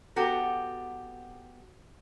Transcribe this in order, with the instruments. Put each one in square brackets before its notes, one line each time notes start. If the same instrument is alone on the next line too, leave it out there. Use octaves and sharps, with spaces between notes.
[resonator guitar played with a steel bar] B3 F#4 G4 A4